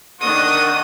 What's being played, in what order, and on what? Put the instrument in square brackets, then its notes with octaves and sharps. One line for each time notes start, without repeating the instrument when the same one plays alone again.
[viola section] D#3 D4 D#5 [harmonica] F#5 C#6 [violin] D#6